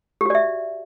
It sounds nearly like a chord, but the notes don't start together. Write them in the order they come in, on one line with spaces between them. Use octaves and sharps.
G4 F#4 D5 E5